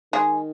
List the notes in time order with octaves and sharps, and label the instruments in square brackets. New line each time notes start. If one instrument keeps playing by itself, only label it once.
[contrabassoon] D#3 [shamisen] G#3 G#4